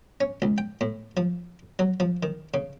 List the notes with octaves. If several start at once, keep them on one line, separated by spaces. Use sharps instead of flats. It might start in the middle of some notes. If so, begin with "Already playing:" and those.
C#4
C#2
G5
A2
F3
F#3
F3
D#3
C#3